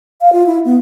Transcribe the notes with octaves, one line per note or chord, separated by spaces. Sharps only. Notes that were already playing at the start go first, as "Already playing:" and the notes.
F5
F4
E4
B3